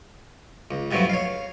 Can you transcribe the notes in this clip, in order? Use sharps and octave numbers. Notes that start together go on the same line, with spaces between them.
C#2
G2 B2 F3 F#3 A3
C#5 F5